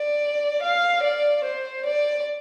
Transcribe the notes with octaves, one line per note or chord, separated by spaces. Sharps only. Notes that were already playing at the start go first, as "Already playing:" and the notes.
Already playing: D5
F5
D5
C5
D5